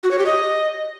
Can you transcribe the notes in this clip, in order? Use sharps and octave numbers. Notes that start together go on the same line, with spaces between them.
F#4
C#5
G4
D#5